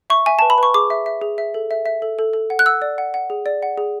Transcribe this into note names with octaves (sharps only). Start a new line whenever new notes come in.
E5 C#6
E5 G#5
B4 A5
B5
B4 C#6
G#4 D6
E5
E5
G#4
E5
A4
E5
E5
A4
A4
A4
F#5
F#6
F#5 E6
D5
F#5
F#5
G#4
D5
F#5
G#4